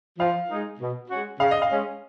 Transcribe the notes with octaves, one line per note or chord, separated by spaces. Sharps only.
F3 F5
G#3 D#4
B2
G#3 C#4 F#4
C#3 F5
D#5
F5
G#3 C#4